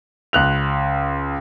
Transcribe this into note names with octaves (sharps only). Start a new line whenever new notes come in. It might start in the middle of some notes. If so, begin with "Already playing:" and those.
C#2 F#6 F7